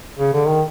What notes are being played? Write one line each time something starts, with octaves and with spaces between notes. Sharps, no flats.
C#3
D3
D#3